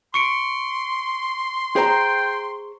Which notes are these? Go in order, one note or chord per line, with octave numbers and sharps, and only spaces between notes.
C6 C#6 C#7 D7
G#4 C5 G5 A#5